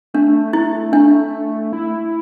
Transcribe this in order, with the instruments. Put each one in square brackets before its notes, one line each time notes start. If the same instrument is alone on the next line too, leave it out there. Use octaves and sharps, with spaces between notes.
[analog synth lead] A3 [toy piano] D4
[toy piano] E4
D4
[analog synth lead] E4